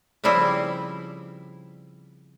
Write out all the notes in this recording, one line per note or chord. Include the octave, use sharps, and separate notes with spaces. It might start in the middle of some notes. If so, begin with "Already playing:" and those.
C#3 F3 G3 C4 E4